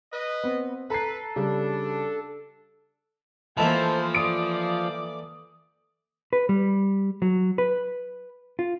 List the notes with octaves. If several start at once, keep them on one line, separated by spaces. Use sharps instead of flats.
B4 D#5
B3 C4
A4 B4 A#5 C7
C#3 G3 D4
E3 F3 A3 A#3 A4 C5 D#5 A5
D5 D#6 D7
B4
G3
F#3
B4
F4